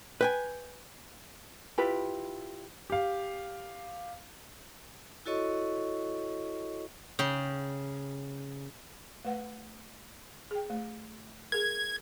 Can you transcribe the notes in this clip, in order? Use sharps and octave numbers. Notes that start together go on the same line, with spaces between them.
B4 G5 G#5
E4 F4 G4 B4
G4 F5
E4 F#4 A4 C#5 D#5 C#6
C#3 G5
A3 B4 F#5
G#4 G5
A3
G#4 A#4 G#6